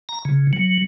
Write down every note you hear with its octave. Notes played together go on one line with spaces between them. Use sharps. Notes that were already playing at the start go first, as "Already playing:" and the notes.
A#5
C#3
F#3